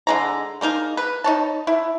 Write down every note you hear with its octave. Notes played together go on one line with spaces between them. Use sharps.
D3 G#3 A#5
G#3 A#3 D#4 A#4
B4
D#4 C#5 A5
E4